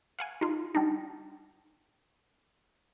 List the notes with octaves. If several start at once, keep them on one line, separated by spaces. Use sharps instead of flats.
F5 F#5 G#5
D#4 F4
G3 D4 D#4